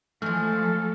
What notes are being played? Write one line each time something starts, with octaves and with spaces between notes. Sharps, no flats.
E3 F3 G#3 A3 A4 F6